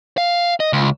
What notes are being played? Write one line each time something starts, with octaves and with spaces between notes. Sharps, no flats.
F5
D#5
C#2